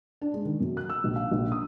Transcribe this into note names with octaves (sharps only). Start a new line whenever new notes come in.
D4
G#3
D#3
F#2
F#6
E6
A#1
F5
A#1
D#6